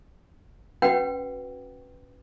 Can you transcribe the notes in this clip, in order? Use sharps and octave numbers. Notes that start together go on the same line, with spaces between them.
C#4 F#4 B4 F#5 G5